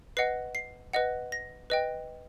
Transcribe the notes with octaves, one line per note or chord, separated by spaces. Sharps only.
B4 D#5 F#5 C7
C7
B4 D#5 F#5
A#6
B4 D#5 G5